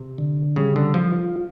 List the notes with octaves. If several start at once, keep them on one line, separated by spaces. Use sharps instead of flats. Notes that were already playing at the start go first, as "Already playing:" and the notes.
Already playing: C3
D3
C#3 G3
D3
F3 F4